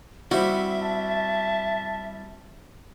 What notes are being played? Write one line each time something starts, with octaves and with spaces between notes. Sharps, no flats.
G3 C4 E4 F#4 E5
A5